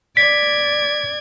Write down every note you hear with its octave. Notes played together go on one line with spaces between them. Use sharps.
D5 G#6 B6